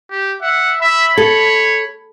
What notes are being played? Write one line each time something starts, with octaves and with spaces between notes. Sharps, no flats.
G4
E5 F#5
E5 B5
A4 C#5